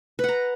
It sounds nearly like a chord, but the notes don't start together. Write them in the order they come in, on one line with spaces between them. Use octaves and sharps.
B4 F#5 A#5